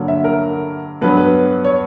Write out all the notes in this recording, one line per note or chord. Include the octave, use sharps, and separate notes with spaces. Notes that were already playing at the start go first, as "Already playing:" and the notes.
Already playing: G2 D3 F#3 A#3
E5
A#4
G2 F#3 B3 B4
B4
C#5